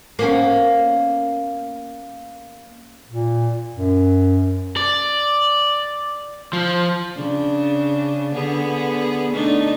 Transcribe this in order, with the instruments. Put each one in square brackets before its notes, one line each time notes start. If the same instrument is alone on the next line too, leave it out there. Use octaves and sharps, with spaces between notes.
[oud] A#3 B3 C#4
[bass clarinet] A#2
F#2
[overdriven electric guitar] D5
F3
[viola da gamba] C#3 D4
D3 B3 G#4
A3 D4 D#4